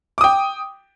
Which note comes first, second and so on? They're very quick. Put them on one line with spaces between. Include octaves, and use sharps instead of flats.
D6 D#6 G5